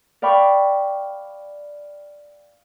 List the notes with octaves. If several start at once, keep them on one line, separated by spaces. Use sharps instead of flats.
D5 F5 G5 B5 C#6 D6